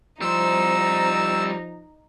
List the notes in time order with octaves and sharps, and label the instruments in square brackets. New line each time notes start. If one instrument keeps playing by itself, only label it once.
[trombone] F3 [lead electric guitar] G3 C5 [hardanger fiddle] D#4 [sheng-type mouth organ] E6